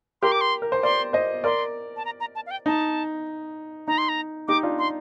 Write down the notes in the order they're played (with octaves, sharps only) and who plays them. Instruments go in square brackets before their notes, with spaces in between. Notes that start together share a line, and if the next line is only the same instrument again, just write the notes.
[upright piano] G4 A#4 [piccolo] C6
[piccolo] D6
C6
[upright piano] A#4
C5
[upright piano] A#4 D5 [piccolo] C6
[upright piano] C5 D#5
[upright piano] A#4 D5 [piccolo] C6
[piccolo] A5
A#5
A#5
A5
F5
G5
[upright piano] D#4 [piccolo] A5
[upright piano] D#4 [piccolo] A#5
[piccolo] C6
A#5
[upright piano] D#4 G4 [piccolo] D6
[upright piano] D4 F4
[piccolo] C6